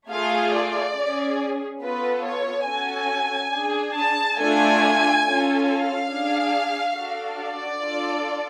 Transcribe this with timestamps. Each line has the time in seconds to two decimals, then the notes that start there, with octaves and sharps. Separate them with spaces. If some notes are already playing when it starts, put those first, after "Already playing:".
0.10 A3 F4 G#4 F5
0.54 D5
0.96 C#4
1.01 G#4
1.82 B3 F4 A4 B4
2.24 C#5
2.68 C#4 F#4 A4 G#5
3.54 D4 G#4
3.97 A5
4.39 A3 D4 F4 A4 G#5
5.25 C#4 F4 A4
5.67 F5
6.10 D4 G#4
6.96 D4 F#4 A4
7.39 D5
7.82 D4 F4 A4